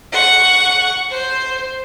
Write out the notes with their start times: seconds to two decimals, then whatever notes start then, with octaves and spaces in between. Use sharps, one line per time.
0.13 F#5 C#6
1.11 C5